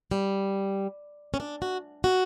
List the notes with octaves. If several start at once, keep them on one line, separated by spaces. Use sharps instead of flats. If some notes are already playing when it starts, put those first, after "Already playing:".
G3
C#4
D4
F#4
F#4